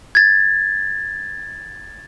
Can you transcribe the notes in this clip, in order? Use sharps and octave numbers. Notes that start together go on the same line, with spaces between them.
G#6 A6